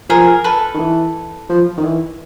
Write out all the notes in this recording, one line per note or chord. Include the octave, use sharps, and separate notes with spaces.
F3 G#4 A#4
A4 B4
D#3
E3
F3
D#3
E3